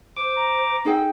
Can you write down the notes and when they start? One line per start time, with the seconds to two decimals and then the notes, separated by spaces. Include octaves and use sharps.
0.17 C5 D6
0.36 A#5
0.85 D#4 G#4 A4 G5